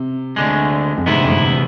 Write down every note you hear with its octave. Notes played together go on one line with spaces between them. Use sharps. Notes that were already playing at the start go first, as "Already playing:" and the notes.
Already playing: C3
D2 D3 G#3
F2
D2 G#2 C3 E3 B3 E4
F2
G#2